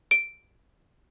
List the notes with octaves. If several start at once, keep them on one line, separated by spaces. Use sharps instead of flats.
D7